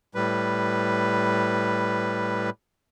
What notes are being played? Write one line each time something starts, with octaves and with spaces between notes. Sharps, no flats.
A2 G3 B4